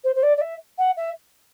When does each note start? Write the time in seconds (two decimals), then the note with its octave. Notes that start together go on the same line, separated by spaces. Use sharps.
0.04 C5
0.15 C5
0.23 D5
0.37 D5
0.41 E5
0.78 F#5
0.97 E5